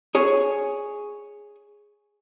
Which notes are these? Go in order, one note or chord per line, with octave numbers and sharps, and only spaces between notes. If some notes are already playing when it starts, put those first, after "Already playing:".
G#4 C#5